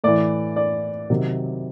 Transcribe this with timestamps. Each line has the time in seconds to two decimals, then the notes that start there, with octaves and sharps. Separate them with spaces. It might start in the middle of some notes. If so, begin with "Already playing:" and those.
0.04 A2 E3 D5
0.56 D5
1.10 C3 D#3 F#3